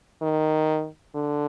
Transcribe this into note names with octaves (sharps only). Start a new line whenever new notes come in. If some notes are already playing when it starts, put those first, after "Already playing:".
D#3
D3